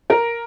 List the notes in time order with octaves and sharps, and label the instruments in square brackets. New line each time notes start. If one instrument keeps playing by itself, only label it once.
[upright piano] A#4